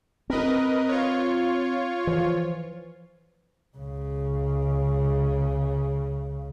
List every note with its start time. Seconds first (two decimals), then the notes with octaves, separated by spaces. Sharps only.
0.30 C4 A#4 B4 D#5
0.88 F4 C#5
2.07 E3 F3
3.77 C#2 C#3